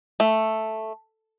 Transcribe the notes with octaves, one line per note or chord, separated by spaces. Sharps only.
A3